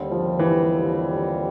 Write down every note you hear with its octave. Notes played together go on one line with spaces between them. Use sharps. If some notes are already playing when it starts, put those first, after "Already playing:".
Already playing: D#2 D3 G3 C4
F3
E3